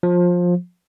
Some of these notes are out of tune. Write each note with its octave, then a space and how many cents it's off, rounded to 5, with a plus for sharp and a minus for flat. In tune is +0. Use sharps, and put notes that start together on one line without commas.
F3 +20